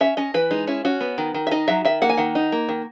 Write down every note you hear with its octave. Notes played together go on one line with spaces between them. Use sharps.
C#4 E5
C#4 D#5
E3 B4
G#3 D#4
C#4 E4
C#4 F#4
B3
D#3
D#3
E5
D#4 D#5
F#3 E5
D#3 E5
A#3 F#5
G#5
D#3 F#5
D#4
A#3
D#3